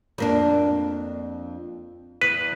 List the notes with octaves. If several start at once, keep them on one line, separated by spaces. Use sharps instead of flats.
F2 A#3 D4
E2 B4